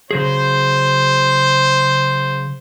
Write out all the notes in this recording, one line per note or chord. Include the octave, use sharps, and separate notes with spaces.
C#3 F#3 G#4 C5